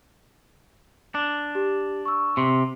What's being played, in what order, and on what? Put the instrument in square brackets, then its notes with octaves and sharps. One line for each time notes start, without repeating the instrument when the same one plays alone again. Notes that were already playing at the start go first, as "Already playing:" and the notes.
[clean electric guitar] D4
[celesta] G4
C#6 E6
[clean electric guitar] C3 [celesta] C6